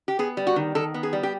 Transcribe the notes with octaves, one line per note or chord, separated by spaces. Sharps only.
G4
B3 G#4
G3
F#4
D#3
D#3 A4
B3
G#4
G3
G4